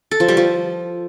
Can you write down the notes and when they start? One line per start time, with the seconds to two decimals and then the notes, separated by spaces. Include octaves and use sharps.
0.11 A4
0.20 F3
0.28 G3
0.37 F3